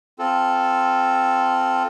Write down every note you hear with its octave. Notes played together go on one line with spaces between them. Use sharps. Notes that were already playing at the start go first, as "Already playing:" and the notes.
C4 F4 A4